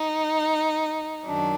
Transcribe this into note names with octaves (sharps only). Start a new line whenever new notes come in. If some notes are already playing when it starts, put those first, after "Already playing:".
Already playing: D#4
F#2 D#3 F#3 D4